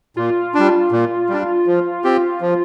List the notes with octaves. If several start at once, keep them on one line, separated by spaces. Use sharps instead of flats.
A#2 F4
G3 D4
A#2
G3 D4
F3
C4 G4
F3